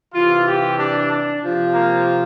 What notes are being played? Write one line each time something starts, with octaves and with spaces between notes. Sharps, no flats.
C3 E3 F4
G4
D4
D4
C3 F3
A#3